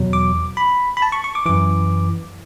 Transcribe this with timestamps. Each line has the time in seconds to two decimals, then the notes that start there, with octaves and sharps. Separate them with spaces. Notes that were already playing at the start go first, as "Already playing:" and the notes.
Already playing: E2 B2 F#3
0.13 D6
0.57 B5
0.97 B5
1.02 A5
1.12 C#6
1.24 C#6
1.35 D6
1.46 F#2 E3 D6